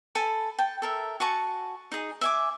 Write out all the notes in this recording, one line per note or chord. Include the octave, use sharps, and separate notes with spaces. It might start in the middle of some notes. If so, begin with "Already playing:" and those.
A4 G#5 A5 B5
G5 A5
A4 A#4 E5
F#4 G#5 A5 C#6
D#4 G#4
E5 G#5 D6